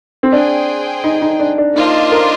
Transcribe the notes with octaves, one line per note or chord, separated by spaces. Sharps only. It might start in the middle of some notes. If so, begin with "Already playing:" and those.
C4
D4 G#4 C5 G5
D#4
D#4
D4
D4
A#3 D4 D#4 F4 C5 D#5
A#4